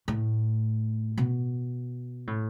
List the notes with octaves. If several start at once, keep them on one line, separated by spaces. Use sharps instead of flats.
A2
B2
A2